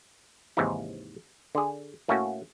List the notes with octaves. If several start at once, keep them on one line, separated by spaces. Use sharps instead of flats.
D#2 G#2 C3 E3 D#4 E4
D3 G#4
A2 A3 A#3 C#4 F#4